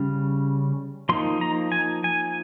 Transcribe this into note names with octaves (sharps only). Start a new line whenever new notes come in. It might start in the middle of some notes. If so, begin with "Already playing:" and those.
Already playing: C#3 G3 C#4
F3 A#3 D#4 C6
A#5
G#5
G#5